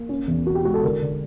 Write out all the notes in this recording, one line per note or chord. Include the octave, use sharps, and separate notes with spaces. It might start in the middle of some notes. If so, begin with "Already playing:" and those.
Already playing: A#3
C#4
E2
B2 F#4
G4
G#3 F#4
A4
D3 A#4
D3